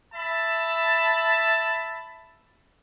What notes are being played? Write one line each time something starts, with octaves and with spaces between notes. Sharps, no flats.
E5 A5 B5